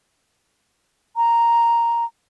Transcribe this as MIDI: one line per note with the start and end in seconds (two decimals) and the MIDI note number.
1.16 2.05 82